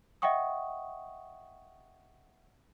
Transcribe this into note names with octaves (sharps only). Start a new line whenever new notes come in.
D#5 E5 F#5 G5 C#6 D#6